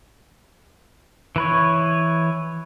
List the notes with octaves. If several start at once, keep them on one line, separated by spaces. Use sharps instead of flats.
E3 B4 C#5